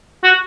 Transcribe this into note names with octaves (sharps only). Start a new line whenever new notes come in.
F#4